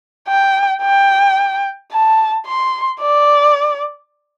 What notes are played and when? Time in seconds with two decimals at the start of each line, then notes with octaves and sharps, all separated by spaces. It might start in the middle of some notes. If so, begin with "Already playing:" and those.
0.28 G5
0.82 G5
1.92 A5
2.46 C6
3.01 D5